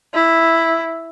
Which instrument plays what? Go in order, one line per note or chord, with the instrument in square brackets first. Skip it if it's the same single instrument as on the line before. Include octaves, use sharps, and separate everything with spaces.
[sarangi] E4